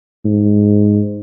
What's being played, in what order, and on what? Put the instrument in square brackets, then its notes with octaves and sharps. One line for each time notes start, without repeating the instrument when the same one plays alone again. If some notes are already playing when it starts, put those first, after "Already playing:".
[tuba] G#2